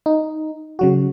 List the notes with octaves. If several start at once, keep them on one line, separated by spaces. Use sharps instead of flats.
D#4
C#3 F#3 F#4